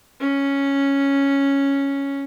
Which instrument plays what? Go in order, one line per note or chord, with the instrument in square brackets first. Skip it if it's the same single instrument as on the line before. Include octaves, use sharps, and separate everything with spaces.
[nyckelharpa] C#4